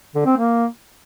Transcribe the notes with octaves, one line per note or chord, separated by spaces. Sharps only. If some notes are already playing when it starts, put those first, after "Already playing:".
D3
C4
A#3